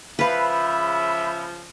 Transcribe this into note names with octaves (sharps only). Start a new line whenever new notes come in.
C#3 F3 B4 E5 F5 B5